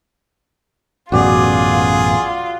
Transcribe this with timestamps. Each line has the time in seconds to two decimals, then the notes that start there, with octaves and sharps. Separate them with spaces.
1.12 A1 F#2 B2 F4 F#4 G#4 D5